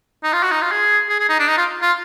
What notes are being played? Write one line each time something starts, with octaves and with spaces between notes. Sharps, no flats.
D#4
F4
F#4
D#4
F4
G#4
G#4
G#4
D#4
D4
D#4
F4
F4